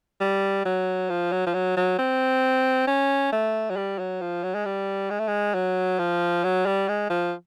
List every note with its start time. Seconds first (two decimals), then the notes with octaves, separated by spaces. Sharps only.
0.21 G3
0.65 F#3
1.09 F3
1.32 F#3
1.47 F3
1.54 F#3
1.77 F#3
1.99 C4
2.87 C#4
3.33 A3
3.70 F#3
3.76 G3
3.99 F#3
4.21 F3
4.43 F#3
4.55 G#3
4.65 G3
5.10 G#3
5.19 A3
5.28 G#3
5.55 F#3
5.99 F3
6.44 F#3
6.66 G3
6.88 G#3
7.10 F3